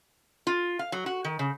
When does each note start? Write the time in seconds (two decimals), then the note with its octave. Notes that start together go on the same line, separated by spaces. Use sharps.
0.47 F4
0.79 F5
0.92 F#3
1.06 F#4
1.24 D#3
1.39 C#3